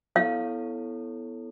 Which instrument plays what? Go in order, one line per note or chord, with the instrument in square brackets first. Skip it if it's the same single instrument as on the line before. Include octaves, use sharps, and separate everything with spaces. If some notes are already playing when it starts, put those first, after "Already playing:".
[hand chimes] B3 E4 A4 C#5 [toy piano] F5